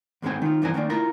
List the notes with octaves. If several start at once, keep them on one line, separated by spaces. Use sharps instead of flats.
D#2 G#2 G#3 A3 C4 G#5
D#3 F4
E2 G2 E3 C4 A#4 G#5
D#3 A3 A#3 D4
E4 F4 A#4